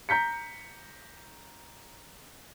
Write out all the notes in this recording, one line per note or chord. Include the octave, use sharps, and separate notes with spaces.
A#5 G6 B6 C#7